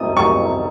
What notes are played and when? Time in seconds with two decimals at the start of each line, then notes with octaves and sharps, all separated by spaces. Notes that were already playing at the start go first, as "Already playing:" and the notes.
Already playing: D#6
0.17 C#6